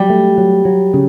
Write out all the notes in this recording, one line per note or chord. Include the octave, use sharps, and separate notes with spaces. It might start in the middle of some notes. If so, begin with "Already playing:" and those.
Already playing: F#3 G3
A3
F#3
F#3
C#3